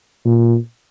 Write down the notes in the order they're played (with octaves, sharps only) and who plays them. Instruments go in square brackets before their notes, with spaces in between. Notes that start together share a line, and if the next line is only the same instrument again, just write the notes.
[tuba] A#2